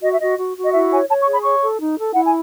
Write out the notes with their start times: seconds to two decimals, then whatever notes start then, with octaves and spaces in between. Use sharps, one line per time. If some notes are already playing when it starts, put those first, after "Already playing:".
0.03 F#4 D#5
0.12 E5
0.19 F#4 D#5
0.38 F#4
0.57 F#4
0.65 D#5
0.73 E4 E5
0.91 C#5 G#5
1.09 C#5 A5
1.21 C#6
1.27 G#4
1.33 B5
1.44 C#5 C#6
1.62 A4
1.80 D#4
1.98 A4
2.15 E4 F#5
2.24 G#5